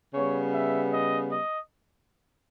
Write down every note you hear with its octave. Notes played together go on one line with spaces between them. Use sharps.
C#3 G3 B3 C#5
E5
D#5
D#5